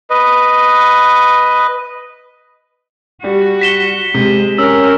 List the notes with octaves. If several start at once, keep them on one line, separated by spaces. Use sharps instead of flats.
B4 D#5
G3 F#4
B6 E7 G7
C3 G#3
C#4 A#4 E6